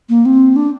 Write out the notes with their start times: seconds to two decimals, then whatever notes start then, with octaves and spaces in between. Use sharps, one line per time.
0.09 A#3
0.25 C4
0.56 D4